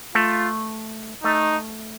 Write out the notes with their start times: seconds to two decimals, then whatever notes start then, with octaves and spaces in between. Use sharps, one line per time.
0.15 A3 F4
1.24 A3 D#4